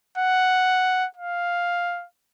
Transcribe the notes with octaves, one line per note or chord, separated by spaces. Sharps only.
F#5
F5